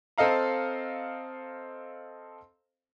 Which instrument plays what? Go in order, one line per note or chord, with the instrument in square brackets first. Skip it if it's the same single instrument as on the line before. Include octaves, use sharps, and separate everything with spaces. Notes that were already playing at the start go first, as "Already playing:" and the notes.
[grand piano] C4 A4 D#5 F5 A#5